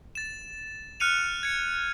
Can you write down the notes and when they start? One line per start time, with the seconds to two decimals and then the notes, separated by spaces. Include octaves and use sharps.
0.15 A6 E7
1.00 F6 F#6 C#7 D#7 F7
1.43 G#6 C#7